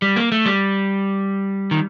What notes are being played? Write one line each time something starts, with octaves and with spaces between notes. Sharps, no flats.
G3
A#3
A3
G3
D#3